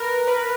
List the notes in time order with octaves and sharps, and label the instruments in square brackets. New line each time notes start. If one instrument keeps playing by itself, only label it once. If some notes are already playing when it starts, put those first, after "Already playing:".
Already playing: [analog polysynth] A#4 B4
B4